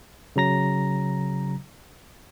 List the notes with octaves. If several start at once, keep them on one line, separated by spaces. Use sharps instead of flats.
C#3 F#3 A#5 A#6